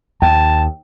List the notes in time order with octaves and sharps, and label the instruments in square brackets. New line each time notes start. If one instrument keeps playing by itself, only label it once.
[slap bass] D#2 [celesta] G5 [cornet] A5